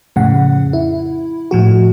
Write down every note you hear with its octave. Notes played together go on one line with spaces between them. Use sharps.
F2 A2 C#3 F#5
E4
A2 F3 F#4